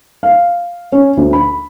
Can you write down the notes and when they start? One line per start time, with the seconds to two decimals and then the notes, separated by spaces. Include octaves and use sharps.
0.23 F5
0.92 C#4
1.17 D2
1.33 B5